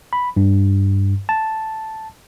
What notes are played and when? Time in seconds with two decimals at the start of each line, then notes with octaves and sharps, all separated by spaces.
0.13 B5
0.36 G2
1.29 A5